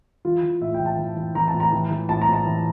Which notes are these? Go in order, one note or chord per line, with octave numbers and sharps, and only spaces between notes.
E3 F4
E3
A2 E5
G5
E3
A5
E3
E3
E3 A#5
A5
A2
A#5
E3
E3
A2 A5
A#5
A2
A5
E3